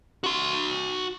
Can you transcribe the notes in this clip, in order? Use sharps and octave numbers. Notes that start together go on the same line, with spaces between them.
F#4 C6